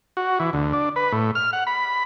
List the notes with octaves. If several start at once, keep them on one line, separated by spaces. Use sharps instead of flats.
F#4
E3
D2
D4
B4
A2
F6
F#5
B5